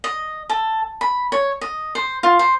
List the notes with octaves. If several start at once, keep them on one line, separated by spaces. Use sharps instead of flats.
D#5
A4
B5
C#5
D#5
C5
F4
C5